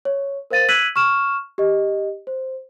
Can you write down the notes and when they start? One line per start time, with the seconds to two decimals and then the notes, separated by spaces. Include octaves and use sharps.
0.05 C#5
0.51 A#4 C5 F5 A6 D#7
0.69 E6 F#6 G#6 B6 D#7 F#7
0.96 C#6 F6 E7
1.58 G4 D#5
2.27 C5